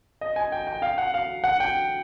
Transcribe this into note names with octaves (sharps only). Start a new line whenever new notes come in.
D#5
G#5
G5
G5
F5
F#5
F5
F#5
G5